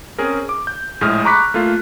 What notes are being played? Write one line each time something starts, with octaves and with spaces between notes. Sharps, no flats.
C4 C#4 G#4 A#4
D6
G6
A#1 A2 G#3 D#6 F6
A#5 B5 C#6 D6 F#6 B6
A3 A#3 F4